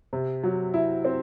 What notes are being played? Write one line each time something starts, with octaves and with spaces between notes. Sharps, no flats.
C3
F#3
E4
C4